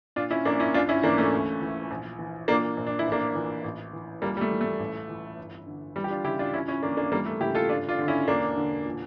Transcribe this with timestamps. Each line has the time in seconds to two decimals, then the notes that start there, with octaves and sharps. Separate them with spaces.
0.16 A#2 D4 F4
0.31 C#4 E4
0.45 A#1 A#3 D4
0.60 C#4 E4
0.74 C#2 D4 F4
0.89 C#4 E4
1.03 E3 A#3 D4
1.18 A3 C#4
1.32 D2
1.61 E3
1.91 A#1
2.19 E3
2.48 A#2 A#3 D4
2.77 A#1
2.87 D4
2.99 E4
3.06 A1
3.12 A#3 D4
3.35 E3
3.64 A1
3.93 E3
4.22 C#2 G3 A#3
4.37 G3
4.41 A3
4.51 E3
4.61 A3
4.80 A1
5.09 E3
5.38 G1
5.66 D3
5.96 E3 G3
6.04 G4
6.10 D4 F4
6.24 C#3 E4 G4
6.39 D4 F4
6.54 C#2 C#4 E4
6.68 C#4 E4
6.83 E3 A#3 D4
6.97 A#3 D4
7.12 E3 G3 A#3
7.26 A3
7.40 C#3 E4 G4
7.55 F4 A4
7.69 G1 D4 F4
7.89 D4 F4
7.98 D3
8.08 C#4 E4
8.27 E1 A#3 D4
8.57 D3
8.85 A#2